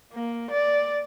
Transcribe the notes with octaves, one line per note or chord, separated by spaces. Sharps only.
A#3
D5